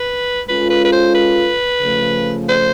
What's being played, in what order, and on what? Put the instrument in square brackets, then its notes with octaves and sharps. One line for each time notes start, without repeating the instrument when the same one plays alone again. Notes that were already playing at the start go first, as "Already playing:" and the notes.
Already playing: [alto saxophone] B4
[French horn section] G#3 C#4 F4 A4 [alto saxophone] B4
[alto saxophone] B4
B4
C5
B4
[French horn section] C#3 F3 A3
[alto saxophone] C5